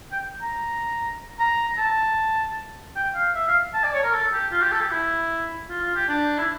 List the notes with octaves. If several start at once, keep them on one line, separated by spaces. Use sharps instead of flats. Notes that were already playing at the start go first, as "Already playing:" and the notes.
G5
A#5
A#5
A5
G5
F5
E5
F5
A5
D5
C#5
A#4
A4
G4
F4
G4
A4
G4
E4
F4
F4
G4
D4
E4